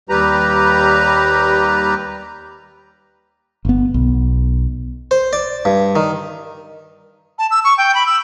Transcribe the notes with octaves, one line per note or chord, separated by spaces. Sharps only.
D#2 G3 G4 B4 A#5
G1 B3
B1
C5
D5
G2
D#3
A5
E6
C#6
G5
B5
E6